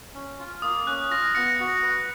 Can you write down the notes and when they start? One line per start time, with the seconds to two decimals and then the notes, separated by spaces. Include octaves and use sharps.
0.14 C#4
0.39 F4
0.62 A#3 D#6
0.87 C#4 F#6
1.11 F4 A#6
1.35 B3 A#6 C#7
1.60 F#4
1.83 B4